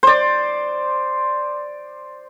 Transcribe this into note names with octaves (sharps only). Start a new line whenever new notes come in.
C5 D5